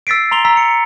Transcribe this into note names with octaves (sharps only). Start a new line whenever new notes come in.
E6 A6 B6 C7 D7
A#5 C6 F7 G7
A#5 E6 B6
C#7